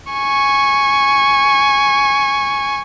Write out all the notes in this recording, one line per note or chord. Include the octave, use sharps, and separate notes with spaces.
G#5 C#6